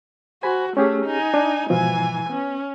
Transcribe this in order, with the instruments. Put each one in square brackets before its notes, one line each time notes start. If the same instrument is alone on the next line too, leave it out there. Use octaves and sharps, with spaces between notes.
[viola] F#4 [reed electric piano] C5 G#5 B5
[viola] A3 [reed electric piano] C#4 G4 G#4
[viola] D#4 G#5
[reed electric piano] D4
[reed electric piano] G#2 B2 F3 [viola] E3 G#5
[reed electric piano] B3 [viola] C#4